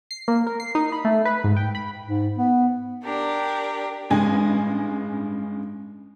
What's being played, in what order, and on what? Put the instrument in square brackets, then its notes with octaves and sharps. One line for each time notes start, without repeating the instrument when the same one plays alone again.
[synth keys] C7
A#3
A#4
C7
D#4
B5
A3
B4
G#2
G5
B5
[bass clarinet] G#2
B3
[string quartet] D4 G4 A#4
[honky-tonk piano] A1 G2 G#3 G#5